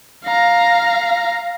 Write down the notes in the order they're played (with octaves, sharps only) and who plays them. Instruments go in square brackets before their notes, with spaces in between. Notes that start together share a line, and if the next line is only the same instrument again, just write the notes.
[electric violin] F5 A#5